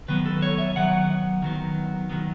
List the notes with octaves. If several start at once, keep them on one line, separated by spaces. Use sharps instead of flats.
D#3 F#3 B3 B4
A4
C#5
E5
D#3 F#3 B3 F#5
D#3 F#3 B3
D#3 F#3 B3